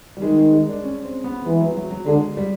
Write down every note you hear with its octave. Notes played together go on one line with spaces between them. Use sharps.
G3
D#3 G#3
G#3
G#3
D4
C#4
C4
B3
E3 G#3
F#3
F#3
F#3
D3 G#3
G3